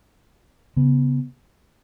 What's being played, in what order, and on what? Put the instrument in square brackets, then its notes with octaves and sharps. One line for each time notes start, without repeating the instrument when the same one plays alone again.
[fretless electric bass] C#3 B3